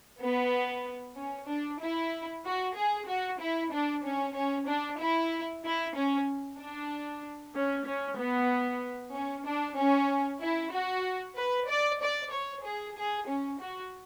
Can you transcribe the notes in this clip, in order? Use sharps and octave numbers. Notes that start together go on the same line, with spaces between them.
B3
C#4
D4
E4
F#4
G#4
F#4
E4
D4
C#4
C#4
D4
E4
E4
C#4
D4
C#4
C#4
B3
C#4
D4
C#4
E4
F#4
B4
D5
D5
C#5
G#4
G#4
C#4
F#4